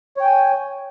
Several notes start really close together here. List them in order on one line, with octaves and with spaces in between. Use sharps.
C#5 G5 G#5